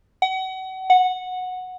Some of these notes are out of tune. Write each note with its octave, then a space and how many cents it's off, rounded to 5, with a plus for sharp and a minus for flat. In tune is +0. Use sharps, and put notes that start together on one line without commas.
F#5 +35
F#5 -10